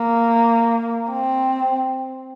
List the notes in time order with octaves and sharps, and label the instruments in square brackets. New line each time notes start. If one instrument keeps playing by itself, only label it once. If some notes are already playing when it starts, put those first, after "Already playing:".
Already playing: [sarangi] A#3
C4